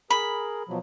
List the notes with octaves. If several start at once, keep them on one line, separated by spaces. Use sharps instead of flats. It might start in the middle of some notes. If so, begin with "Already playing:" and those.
G#4 A#4 B5
B2 F3 F#3